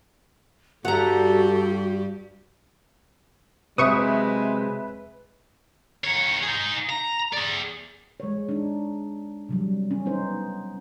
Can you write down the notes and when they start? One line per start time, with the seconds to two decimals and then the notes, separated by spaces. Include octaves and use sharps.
0.85 G2 G3 F#4 G4 A4 F#5 A#5
3.78 C3 F#3 G#3 C4 B4 E5 C#6 D#6
6.04 D#3 C#5
6.43 D#4 G#4
6.90 A#5
7.33 G#4 D5
8.20 G#3 C#5
8.49 D4 D#4
9.49 C3 F#3 G3
9.91 C#4
10.06 B3 D#4 C5